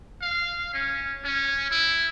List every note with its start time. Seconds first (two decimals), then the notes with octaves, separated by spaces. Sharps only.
0.21 F5
0.74 C#4
1.24 C#4
1.71 E4